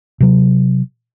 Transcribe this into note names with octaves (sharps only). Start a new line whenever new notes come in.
C3 F#3